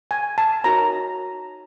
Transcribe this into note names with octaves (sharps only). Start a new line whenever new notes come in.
G#5
A5
D#4 F#4 A#4 C#5 A#5